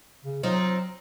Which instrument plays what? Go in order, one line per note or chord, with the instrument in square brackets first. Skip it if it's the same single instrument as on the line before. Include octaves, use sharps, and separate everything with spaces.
[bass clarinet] C#3
[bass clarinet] F#3 [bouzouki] C4 D#4 F4